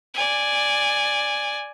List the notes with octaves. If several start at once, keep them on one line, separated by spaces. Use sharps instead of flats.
D5 G#5